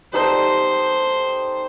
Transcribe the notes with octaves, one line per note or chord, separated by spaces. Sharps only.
G3 D#4 A4 C5